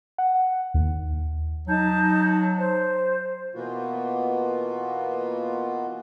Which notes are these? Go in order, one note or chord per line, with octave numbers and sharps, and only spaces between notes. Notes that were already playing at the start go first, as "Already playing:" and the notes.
F#5
D#2
F#3 D#4 A5 G6
C5
B2 E3 A#3 B3 F4 F#4